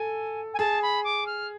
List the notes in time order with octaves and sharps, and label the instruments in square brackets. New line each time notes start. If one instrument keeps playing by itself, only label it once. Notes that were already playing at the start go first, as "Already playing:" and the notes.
Already playing: [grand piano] A4 [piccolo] G#5
[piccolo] G#5
[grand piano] G#4 [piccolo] A5
[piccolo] B5
D6
F6